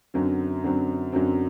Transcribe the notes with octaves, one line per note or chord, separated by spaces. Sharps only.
F#2 D3 F#3 C4
F#2 D3 F#3 C4
F#2 D3 F#3 C4